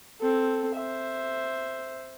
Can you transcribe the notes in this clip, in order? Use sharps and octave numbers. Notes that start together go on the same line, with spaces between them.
C4 A4
C5 E5